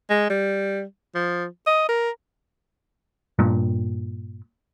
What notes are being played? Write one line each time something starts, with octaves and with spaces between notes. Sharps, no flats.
G#3
G3
F3
D#5
A#4
G2 A#2